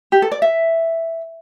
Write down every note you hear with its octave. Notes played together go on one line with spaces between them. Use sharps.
G4
A4
D5
E5